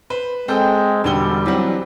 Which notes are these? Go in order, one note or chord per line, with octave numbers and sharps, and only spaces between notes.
B4 C5
G#3 C4 A4 D#5 G5 D#6 G6
E1 D3 G3 F#4 G#5 A5 G7
E3 F#3 C4 B4 F#5